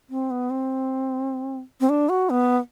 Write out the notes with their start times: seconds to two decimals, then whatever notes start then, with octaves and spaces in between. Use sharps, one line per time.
0.10 C4
0.31 B3
0.50 C4
1.80 C4
1.89 D4
2.09 F#4
2.30 B3